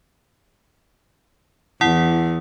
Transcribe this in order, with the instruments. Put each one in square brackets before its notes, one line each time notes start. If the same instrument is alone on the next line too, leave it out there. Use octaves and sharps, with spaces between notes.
[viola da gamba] E2 [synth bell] E4 F#5 D#6